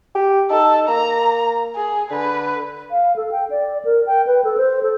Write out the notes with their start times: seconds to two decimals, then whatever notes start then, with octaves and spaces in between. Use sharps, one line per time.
0.15 G4
0.51 D#4 A4
0.88 A#3 A#5
1.75 G#4
2.11 D3 B4
2.91 F5
3.16 A4
3.31 G5
3.50 D5
3.85 A#4
4.07 G5
4.27 B4
4.44 A4
4.58 C5
4.83 A4